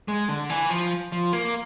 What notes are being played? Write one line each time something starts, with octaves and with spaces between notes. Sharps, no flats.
G#3
D3
E3
F3
F3
A#3